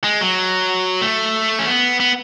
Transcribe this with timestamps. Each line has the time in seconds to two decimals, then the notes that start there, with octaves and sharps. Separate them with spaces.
0.04 G#3
0.21 F#3
1.02 A3
1.59 C#4
1.67 B3
2.00 B3